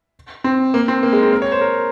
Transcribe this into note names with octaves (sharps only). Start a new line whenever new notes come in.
C4
A#3
C4
A#3
G#3
C4
A#4
C#5
C5
A#4